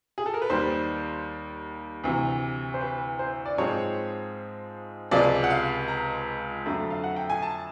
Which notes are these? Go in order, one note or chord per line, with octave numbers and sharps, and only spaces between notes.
G#4
A4
A#4
B4
D#2 D#3 G3 C5
D2 C3 E3
C5
B4
C5
D5
G#2 F3 G#3 C4 C#5
C#2 C3 F3 G#3 D5
F#5
F5
A#5
F2 D3 F#3 A3
F5
F#5
G5
G#5
A5